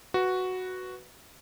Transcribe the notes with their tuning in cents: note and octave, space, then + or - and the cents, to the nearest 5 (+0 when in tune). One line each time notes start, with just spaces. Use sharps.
F#4 +0 B4 +0